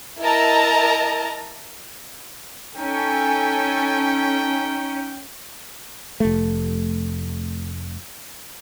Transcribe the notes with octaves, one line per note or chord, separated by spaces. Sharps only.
E4 A#4 D#5 A5 A#5
C#4 D#4 A4 G5 G#5
F1 A3